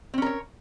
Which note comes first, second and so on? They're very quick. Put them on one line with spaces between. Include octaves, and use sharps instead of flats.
C4 C#4 A#4 C#5